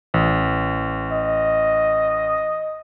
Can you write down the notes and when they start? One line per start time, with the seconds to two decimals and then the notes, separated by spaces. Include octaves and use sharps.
0.14 A1
1.12 D#5